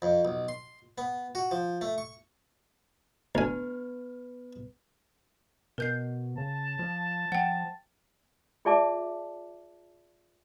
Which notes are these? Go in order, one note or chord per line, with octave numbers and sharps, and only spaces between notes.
F2
B1
C6
B3
F#4
F3
A3
C#6
D2 B3 B4 G#5
B2 A#4 G6 C7
C#3 A5
F3
F3 F#5 G5
F4 G#4 D5 E5 A5 D6